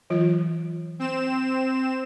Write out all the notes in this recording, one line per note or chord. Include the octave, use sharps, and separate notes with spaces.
E3 F#3 F4
C4 E7